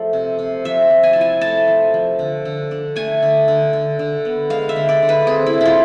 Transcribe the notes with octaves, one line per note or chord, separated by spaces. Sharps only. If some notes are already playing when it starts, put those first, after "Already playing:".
Already playing: F3 A3 A4
C3
C3
F3 E5
F3
G#5
E4 A5
G#5
A3 A5
F3
F3
D3
D3
D4
A3 G#5
D3
D3
D3
D3
B3
G#3 F5
E5
D3
D5
D3
B4
C4 G#4
E4
C3
E4 F4